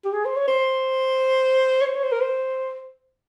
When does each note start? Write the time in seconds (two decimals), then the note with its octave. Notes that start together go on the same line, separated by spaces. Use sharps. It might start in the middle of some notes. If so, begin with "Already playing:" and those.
0.05 G4
0.13 G#4
0.25 C5
0.36 C#5
0.48 C5
1.81 C#5
1.86 C5
1.95 C#5
2.03 C5
2.12 A#4
2.21 C5